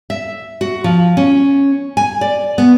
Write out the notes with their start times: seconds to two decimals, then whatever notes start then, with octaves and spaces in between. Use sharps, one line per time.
0.10 E5
0.61 F#4
0.84 F3
1.17 C#4
1.97 G#5
2.21 D5
2.58 B3